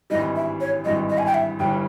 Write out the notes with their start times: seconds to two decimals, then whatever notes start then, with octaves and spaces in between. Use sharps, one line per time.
0.10 G#1 G2 E3 G3 D#5
0.36 E5
0.61 C#5
0.85 G#1 G2 E3 G3 D#5
1.10 D#5
1.18 G#5
1.26 G5
1.34 E5
1.59 G1 G2 E3 G3 G5